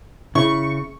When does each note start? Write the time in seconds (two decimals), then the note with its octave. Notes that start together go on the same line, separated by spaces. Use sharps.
0.35 C#3 E4 C#6